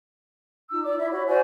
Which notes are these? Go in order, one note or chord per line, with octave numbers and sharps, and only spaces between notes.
D#4 F4 E6
D5 D6
E4 E5
F#4 C#5
F#4 C5 D5 G#5